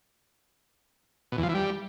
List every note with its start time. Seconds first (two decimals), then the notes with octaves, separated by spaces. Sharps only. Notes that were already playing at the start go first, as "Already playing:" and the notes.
1.32 B2
1.38 E2
1.43 F3
1.49 E3
1.54 G3